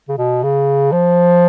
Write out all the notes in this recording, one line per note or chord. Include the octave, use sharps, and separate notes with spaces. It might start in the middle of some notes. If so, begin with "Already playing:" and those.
C#3
B2
C#3
F3